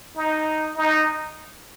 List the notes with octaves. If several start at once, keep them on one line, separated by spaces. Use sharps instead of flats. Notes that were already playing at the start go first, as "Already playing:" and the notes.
D#4
D#4